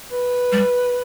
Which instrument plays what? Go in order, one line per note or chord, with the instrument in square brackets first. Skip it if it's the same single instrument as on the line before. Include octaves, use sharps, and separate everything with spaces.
[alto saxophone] B4
[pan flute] G3